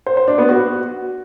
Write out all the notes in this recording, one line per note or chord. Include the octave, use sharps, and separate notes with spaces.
C5
C5
D4
B3
F#4